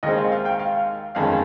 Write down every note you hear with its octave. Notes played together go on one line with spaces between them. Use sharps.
D#2 D#3 G#3 C4 D#5
F5
F5
G5
F5
G1 F2 D#3 G#3 C#4 F5